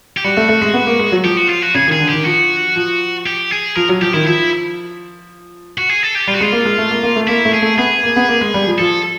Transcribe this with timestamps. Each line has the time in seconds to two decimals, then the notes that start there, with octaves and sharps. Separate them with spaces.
0.17 G4
0.24 G3 F#4
0.37 A3
0.49 A3
0.61 G#3
0.74 B3
0.87 A#3
0.99 G#3
1.12 F#3
1.24 F3 G4
1.37 F#4
1.49 F4
1.62 F#4
1.75 C#3 G#4
1.88 D#3
1.92 G#4
2.00 D3
2.09 D#3 G4
2.25 F3 F#4
2.76 F3
3.26 G4
3.51 G#4
3.75 F3 A#4
3.89 F#3
4.01 F3 G4
4.13 D#3 E4
4.27 F3 E4
5.78 F#4
5.89 G#4
6.03 A4
6.15 G4
6.28 G3 F4
6.35 F#4
6.41 G#3 F4
6.52 A#3
6.65 G#3
6.78 A3
6.91 A#3
7.03 A#3
7.16 A3
7.28 A#3 E4
7.45 A3
7.54 G#4
7.62 A3
7.78 B3 G#4
8.03 A#3
8.16 B3
8.28 A#3
8.41 G#3
8.54 G3
8.67 F3
8.79 F3 A4